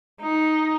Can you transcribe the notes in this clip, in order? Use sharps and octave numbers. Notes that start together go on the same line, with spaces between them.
D#4